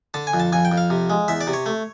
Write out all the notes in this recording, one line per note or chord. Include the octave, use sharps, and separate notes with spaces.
D3 A5
G#5
F2
A5
F2 G#5
G5
F2
F5
C3
G#3
E2 E5
D5
C3
C#5
A3